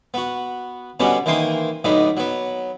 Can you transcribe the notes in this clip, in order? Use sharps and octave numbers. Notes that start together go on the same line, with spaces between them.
B3 F#4
B2 D3 G3 B3 C#4 F#4
D#3 E3 A#3 C5 C6 D#6
B1 A2 D3 B3 D#4
F#3 B3